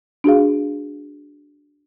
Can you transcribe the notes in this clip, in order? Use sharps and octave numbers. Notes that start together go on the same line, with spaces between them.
D4 F#4 G#4 F5